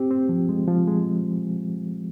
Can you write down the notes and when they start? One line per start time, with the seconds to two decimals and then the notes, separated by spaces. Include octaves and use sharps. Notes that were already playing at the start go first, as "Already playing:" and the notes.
Already playing: C4 G4
0.11 C4
0.29 F3
0.49 G#3
0.68 F3
0.88 G#3